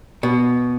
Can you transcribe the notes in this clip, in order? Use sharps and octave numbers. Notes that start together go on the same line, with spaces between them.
B2